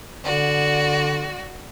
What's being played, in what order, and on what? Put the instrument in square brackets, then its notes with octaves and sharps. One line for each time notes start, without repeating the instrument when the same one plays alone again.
[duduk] D3 [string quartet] F#4 D5